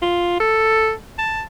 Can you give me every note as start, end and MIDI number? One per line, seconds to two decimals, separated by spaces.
0.02 0.37 65
0.40 0.92 69
1.19 1.43 81